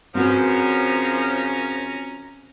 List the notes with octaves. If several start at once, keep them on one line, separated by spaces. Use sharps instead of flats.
F#2 C#3 F3 C4 C#4 F#4 B4 A#5